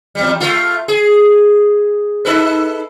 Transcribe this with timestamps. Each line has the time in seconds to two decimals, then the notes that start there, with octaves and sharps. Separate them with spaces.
0.15 E2 G3
0.40 A3 F4
0.88 G#4
2.25 D#4 A4 B4